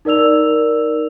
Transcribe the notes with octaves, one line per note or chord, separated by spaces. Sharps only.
D#4 A#4 D5 E6 F7